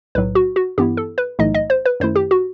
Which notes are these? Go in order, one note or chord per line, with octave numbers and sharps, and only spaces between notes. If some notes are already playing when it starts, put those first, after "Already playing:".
B1 A2 F#3 B4
F#4
F#4
G2 E3 B3 E4 G4
A4
B4
B1 A2 E3 A3 D#4 D#5
D#5
C5
B4
F#2 D#3 A3 E4 C5
G4
F#4